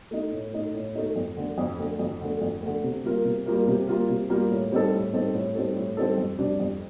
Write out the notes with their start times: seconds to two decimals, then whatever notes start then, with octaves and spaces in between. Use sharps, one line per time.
0.11 A3 D#4
0.32 A2
0.53 A3 D#4
0.74 A2
0.95 A3 D#4
1.16 F2
1.37 D3 A3
1.58 F2
1.79 D3 A3
1.99 F2
2.21 D3 A3
2.41 F2
2.62 D3 A3
2.83 C3
3.04 G3 A#3 F4 A#4
3.25 C3
3.46 G3 A#3 F4 A#4
3.67 C3
3.88 G3 A#3 F4 A#4
4.09 C3
4.30 G3 A#3 F4 A#4
4.51 A2
4.72 G3 C4 D#4 A4
4.93 A2
5.13 G3 C4 D#4 A4
5.34 A2
5.55 G3 C4 D#4 A4
5.76 A2
5.97 G3 C4 D#4 A4
6.18 F2
6.39 C3 G3 D4
6.60 F2